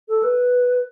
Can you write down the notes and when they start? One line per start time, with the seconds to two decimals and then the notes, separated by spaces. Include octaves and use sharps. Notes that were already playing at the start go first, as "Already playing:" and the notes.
0.08 A4
0.23 B4